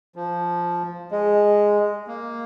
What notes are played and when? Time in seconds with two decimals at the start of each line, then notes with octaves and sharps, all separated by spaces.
0.16 F3
1.11 G#3
2.07 A#3